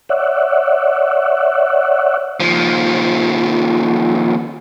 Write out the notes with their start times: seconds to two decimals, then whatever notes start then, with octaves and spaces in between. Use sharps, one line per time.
0.09 C#5 D5 E5 F#5
2.40 D#2 F3